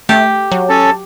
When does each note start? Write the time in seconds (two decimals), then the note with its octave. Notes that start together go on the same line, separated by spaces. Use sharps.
0.09 A3 G4
0.52 F#3
0.69 C#4 A4 A5